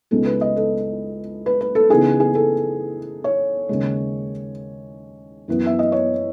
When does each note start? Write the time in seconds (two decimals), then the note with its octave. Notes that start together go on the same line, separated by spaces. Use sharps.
0.11 C#2 C#3 G#3 B3 D#4 A4
0.26 B4
0.41 D#5
0.56 A4
1.46 B4
1.61 B4
1.75 A4
1.90 C#3 E3 B3 D#4 G#4
2.20 G#4
2.35 A4
3.24 C#5
3.69 D#2 C#3 G#3
5.48 F#2 E3 B3
5.66 E5
5.79 D#5
5.92 C#5